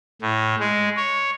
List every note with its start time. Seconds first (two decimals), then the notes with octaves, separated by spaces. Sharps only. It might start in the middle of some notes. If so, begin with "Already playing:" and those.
0.22 A2
0.59 G#3
0.97 C#5